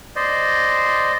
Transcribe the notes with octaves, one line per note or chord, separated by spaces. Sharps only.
C5 D5 D#5